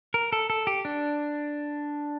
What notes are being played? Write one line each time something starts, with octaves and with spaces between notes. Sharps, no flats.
A#4
A4
A4
G4
D4